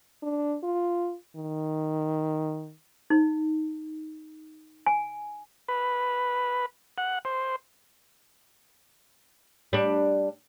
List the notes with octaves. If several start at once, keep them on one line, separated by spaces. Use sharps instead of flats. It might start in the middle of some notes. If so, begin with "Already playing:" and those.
D4
F4
D#3
D#4
G#5
B4
F#5
C5
G3 D4